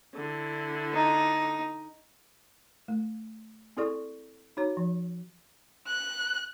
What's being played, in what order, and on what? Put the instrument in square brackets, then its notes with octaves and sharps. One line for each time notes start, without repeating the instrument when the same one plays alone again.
[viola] D3 E4
[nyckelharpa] D#4
[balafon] A3
C4 E4 G#4 A4 D5 C#6
D#4 F#4 C#5 A#5
F3
[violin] F#6